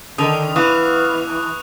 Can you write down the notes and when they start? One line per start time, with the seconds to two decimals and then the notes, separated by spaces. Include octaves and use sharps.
0.18 D3 D#3 D#6 F7
0.56 E3 B3 F5 C#6 D#6 F#6